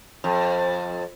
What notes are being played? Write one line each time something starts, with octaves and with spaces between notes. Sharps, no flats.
F2